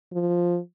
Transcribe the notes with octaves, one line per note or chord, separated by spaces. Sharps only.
F3